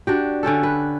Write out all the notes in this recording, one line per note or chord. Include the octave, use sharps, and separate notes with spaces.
D4 F#4 G4
D3 C#4 G4 A4
B4